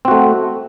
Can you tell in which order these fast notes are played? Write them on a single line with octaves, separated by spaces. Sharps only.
C4 F#4 A3